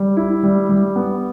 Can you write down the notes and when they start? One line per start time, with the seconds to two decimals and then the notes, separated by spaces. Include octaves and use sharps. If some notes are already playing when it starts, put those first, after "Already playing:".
Already playing: G3
0.17 E4
0.43 G3
0.69 G3
0.96 B3